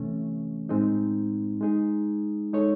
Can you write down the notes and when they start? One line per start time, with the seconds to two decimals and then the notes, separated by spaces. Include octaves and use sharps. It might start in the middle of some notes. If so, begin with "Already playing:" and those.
Already playing: C3 E3 A3 C#4
0.69 A2 G#3 C4 D#4
1.61 G#3 D#4 G#4
2.53 G#3 D#4 A4 C#5